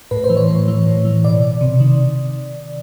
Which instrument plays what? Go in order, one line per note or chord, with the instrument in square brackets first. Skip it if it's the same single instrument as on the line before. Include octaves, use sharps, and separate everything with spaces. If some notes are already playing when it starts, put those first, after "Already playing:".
[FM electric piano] A2 B4
C5
E3
C#5
A2
E3
A2
E3
B2 D5
C3
D#3